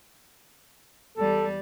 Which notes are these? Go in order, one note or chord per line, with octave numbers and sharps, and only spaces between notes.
E2 G3 A4 D5